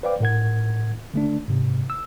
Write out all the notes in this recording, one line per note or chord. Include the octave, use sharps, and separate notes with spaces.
B4 C5 D5 F5 G5 D6
A2 A#4 F#5 G#6
D3 A3 D4
G#2 C3
E6